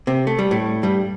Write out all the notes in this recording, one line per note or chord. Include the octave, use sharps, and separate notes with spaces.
C3 C4
A3
G3
A2 A3
G2 G3